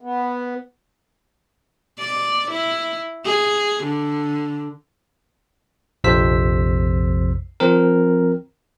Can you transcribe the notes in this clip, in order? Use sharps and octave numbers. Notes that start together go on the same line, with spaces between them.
B3
D5
E4
G#4
D3
A#1 F2 C3 C5 E6 B6
F3 C4 A#4